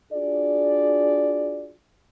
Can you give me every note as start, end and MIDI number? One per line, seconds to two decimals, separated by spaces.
0.13 1.74 62
0.13 1.74 65
0.13 1.74 66
0.13 1.74 68
0.13 1.74 74